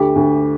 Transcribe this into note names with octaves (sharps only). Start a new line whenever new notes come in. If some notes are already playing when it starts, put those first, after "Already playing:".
Already playing: D2 G4
D2